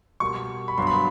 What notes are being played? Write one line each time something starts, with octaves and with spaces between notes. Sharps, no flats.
B2 G3 A#3 C#6
B5
G2 D3 F#3 B3 C6
B5